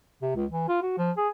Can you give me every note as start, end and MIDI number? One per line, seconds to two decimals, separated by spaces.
0.22 0.31 48
0.36 0.46 37
0.51 0.68 52
0.69 0.81 65
0.82 0.95 66
0.98 1.11 53
1.17 1.28 68